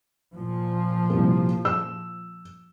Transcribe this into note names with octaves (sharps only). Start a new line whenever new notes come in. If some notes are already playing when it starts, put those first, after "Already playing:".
A#2 F3
C2 A#3
E6